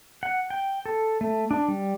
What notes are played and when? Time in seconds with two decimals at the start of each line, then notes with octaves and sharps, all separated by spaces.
0.23 F#5
0.50 G5
0.86 A4
1.21 A3
1.51 D4
1.68 G3